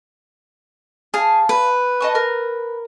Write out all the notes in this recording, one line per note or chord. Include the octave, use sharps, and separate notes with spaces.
G#4 F5 A5
B4
D#5 A5 C#6
A#4